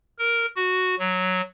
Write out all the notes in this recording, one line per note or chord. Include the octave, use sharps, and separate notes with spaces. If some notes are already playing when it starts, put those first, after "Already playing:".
A#4
F#4
F#3